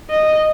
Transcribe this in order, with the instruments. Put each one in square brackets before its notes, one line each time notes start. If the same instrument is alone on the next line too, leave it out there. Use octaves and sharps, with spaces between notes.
[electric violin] D#5